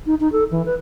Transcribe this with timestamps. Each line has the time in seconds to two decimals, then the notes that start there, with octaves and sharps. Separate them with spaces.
0.06 D#4
0.20 D#4
0.32 A4
0.51 E3
0.66 B4